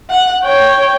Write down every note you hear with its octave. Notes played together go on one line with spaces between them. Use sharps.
F#5
C#5 G5